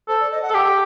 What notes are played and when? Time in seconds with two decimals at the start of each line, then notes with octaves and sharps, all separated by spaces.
0.08 A4 C5
0.20 D5
0.31 D#5
0.42 F#5
0.50 A4
0.54 G4 G5